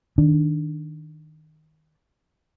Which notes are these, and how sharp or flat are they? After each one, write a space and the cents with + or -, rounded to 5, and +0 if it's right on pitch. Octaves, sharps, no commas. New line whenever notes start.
D#3 +0 D4 +0